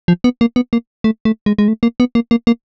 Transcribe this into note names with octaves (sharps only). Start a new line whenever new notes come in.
F3
B3
A#3
B3
A#3
A3
A3
G#3
G#3
A3
A#3
B3
A#3
A#3
A#3